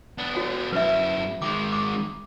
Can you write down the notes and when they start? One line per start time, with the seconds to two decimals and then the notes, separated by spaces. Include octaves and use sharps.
0.18 B3 D4
0.35 F#4 C#5 G5
0.72 F#2 E4 B4 E5
1.42 D#3 G#3 D6
1.73 D6